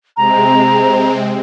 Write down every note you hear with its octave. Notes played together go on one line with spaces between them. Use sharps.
C3 G#3 C4 A#5